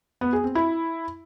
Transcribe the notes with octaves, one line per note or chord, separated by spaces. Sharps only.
B3
G#4
C4
E4